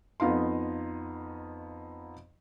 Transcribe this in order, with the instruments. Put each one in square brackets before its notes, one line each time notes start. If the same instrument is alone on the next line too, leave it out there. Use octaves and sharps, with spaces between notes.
[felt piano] F2 B3 D#4 F5 C6